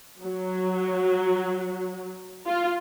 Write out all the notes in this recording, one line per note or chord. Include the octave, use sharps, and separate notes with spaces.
F#3
F4